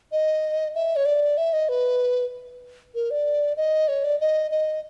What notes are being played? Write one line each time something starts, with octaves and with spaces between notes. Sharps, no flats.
D#5
E5
C#5
D5
E5
D#5
B4
A#4
D5
D#5
C#5
D5
D#5
D#5